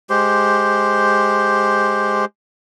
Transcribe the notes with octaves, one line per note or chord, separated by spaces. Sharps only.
G#3 G4 C5